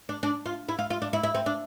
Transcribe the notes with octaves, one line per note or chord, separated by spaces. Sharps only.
D4
D4
F4
E4
F4
F4
D4
E4
E4
C4
D4